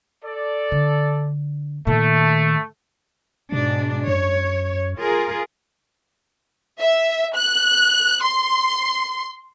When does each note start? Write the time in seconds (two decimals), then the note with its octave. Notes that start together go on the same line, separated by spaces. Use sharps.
0.24 A4 D5
0.72 D3
1.87 A#2 D#3 A3
3.52 G#2 B2 D4
4.07 F#2 C#5
4.99 F4 G#4 A#4
6.80 E5
7.36 F#6
8.23 C6